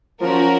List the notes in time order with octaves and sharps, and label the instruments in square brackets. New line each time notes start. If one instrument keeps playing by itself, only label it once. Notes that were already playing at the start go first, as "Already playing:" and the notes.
[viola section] F3 [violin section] C#4 F#4 A#4